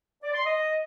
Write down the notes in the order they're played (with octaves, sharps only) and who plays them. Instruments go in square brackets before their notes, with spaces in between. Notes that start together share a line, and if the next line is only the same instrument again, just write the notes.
[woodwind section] D5
C6
D#5